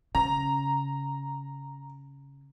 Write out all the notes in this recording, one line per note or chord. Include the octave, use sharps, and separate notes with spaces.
C#3 A#5